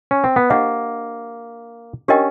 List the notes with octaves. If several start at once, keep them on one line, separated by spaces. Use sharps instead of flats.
C#4
C4
B3
A#3 D4 G4 C5 D#5 F#5
C#4 D4 G4 A#4 D#5 G5